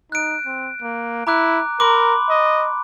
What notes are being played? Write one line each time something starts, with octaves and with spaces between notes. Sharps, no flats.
D#4 F#6 D7
C4
A#3
E4 A#5 D6 F#6
A#4 B5 C6 D6
D#5